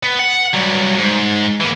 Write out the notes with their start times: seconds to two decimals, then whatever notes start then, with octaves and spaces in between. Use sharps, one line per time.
0.03 B3
0.19 F#5
0.54 G2 F#3
0.98 G#2
1.61 E3 A#3